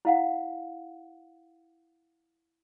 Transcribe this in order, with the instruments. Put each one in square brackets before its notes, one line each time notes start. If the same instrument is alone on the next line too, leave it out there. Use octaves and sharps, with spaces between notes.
[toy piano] E4 F5 F#5